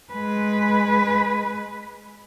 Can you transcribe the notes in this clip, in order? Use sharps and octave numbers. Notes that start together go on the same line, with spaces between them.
G#3 B4